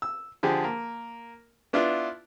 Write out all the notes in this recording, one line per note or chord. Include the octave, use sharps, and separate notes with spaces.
E6
D3 F3 G4 G#4
A#3
B3 D4 E4 F4